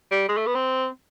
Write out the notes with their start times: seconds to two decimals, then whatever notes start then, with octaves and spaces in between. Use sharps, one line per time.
0.11 G3
0.28 G#3
0.37 A3
0.46 B3
0.55 C4